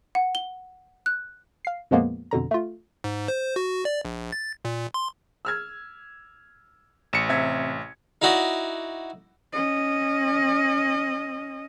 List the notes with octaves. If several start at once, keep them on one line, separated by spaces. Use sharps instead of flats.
F#5
G7
F#6
F5 C7
F2 A#2 F3 G#3 A#3 B3
F2 B2 D3 A#5
A3 F4
G#2
C5
F#4
D5
A#1
A6
A#2
C6
E6 F6 G#6
A1 C#7 E7
C3 E5 G#6
D#4 E4 F#4 D5 D#5
C#4 D#5